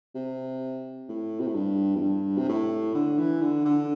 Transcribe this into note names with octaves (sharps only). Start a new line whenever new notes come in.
C3
A2
C3
A2
G2
E2
G2
C3
A2
D3
E3
D3
D3